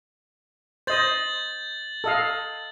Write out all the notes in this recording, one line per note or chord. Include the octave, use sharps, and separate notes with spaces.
C5 D#5 G6 A6 F#7
A4 D#5 F5